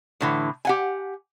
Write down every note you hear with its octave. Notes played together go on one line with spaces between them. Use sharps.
A2 D3 E3
G4 F#5 G#5